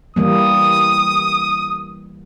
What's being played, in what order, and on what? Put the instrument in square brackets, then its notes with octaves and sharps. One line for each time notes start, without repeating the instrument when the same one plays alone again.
[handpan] E3 G3 A#3 [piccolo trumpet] D#6